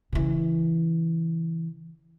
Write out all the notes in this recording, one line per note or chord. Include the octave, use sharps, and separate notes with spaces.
C#3 E3